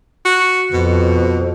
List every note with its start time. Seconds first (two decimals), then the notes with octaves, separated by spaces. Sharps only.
0.25 F#4
0.73 F2 B2